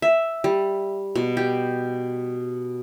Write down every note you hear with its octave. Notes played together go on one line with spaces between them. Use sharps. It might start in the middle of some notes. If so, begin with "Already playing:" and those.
E5
G3
B2
G4